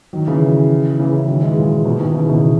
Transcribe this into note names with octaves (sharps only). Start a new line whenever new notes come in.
D#3 F#3
C#3 E3
C#3 E3
C#3 E3
D#3 F#3
E3 G#3
A#2
B2
B2 D#3
C#3 E3
B2 D#3